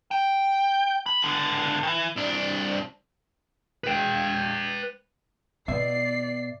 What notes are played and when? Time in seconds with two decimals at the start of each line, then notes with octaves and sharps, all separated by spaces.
0.11 G5
1.06 B5
1.23 C#2 D3
1.83 D#3 E3
2.16 C2 D4
3.84 B4 G5
5.68 B2 B3 D5 E5 C7